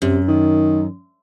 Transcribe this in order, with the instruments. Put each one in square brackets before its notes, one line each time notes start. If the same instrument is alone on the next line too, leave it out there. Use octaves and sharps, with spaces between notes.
[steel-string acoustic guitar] F#2 [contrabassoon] C3
[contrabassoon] D#3